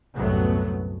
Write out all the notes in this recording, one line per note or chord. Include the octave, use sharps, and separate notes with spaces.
C2 F#2 A2 F#3 A3 B3